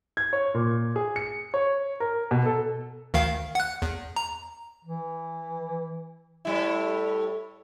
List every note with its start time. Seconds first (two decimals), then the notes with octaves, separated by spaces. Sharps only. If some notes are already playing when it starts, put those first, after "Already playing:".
0.17 G#6
0.33 C#5
0.54 A#2
0.96 G#4
1.16 C#7
1.54 C#5
2.00 A#4
2.31 B2
2.46 A4
3.14 D2 D#3 F5
3.55 F#5 F#6
3.82 E2
4.16 A#5
4.84 E3
6.45 A2 G3 E4